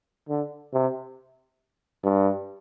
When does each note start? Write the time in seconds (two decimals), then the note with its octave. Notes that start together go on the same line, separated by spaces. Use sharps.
0.29 D3
0.73 C3
2.04 G2